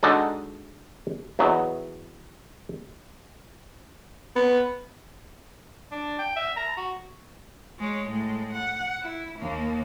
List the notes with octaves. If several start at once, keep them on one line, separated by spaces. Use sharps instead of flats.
G#3 D4 D#4 F#4 A4 D5
E2 F#3 B3 D#5
B3
D4
G5
E5
A#5
F#4
G#3 C#5
A2 G#3
F#5
E4
D#2 A#3